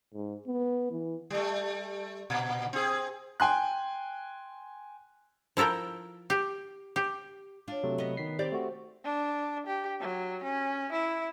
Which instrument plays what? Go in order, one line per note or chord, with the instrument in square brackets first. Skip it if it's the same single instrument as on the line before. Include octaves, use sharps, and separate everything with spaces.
[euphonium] G#2
B3
E3
[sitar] G3 A3
A#2
C4 G#4
[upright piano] G5 G#5 C6 F#6
[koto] F3 E4 A4 A#4 G5
G4
G4
[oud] D4 F4 [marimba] C#5 F5
[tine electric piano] C3 F#3 A3
[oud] B3 D#5
[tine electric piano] D#3 B6 C7
[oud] C4 G4 D5 [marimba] C5
[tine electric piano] A3 F#4
[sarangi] D4
G4
F#3
C#4
E4